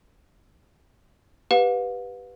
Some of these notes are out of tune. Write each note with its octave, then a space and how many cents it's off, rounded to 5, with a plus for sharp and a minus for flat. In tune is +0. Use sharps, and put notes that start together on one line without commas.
G4 +0 B4 +0 F5 +40